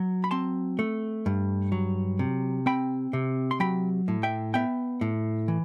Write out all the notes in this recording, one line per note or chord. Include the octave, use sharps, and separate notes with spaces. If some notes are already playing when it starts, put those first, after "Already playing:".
Already playing: F#3
B5
C4 A5 C6
A3
G2
F#3
C3
C4 G5 B5
C3
C6
F#3 G5 B5
A2
E5 G5
B3 E5 G5
A2
E3